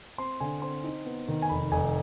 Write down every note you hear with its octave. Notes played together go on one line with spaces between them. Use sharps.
C4 C6
D3 G#5
C4 C6
D#4
B3
D#3
G#5
F1 B5
F1 G#5